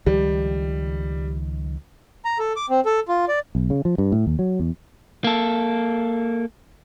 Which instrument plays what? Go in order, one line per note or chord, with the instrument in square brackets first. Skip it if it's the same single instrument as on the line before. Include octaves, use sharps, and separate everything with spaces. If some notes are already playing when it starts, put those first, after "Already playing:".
[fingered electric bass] C#2 D#3 F3 [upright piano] G3
[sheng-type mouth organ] A#5
A4
D6
C4
A4
F4
D5
[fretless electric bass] B1
C#3
F3
G2
A2
D#2
F#3
E2
[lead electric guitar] A#3 A4